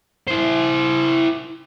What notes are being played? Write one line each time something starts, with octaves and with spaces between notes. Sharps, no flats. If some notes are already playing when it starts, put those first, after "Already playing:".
E4 C5